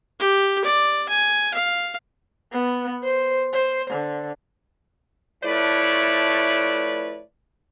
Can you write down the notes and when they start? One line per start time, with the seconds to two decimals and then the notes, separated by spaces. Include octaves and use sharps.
0.19 G4
0.64 D5
1.09 G#5
1.54 F5
2.52 B3
3.04 C5
3.54 C5
3.90 D3
5.44 F3 A3 E4 B4 C#5 D5